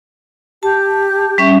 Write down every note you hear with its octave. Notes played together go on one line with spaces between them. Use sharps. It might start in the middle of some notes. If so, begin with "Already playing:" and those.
G4 A5
G3 C#4 E5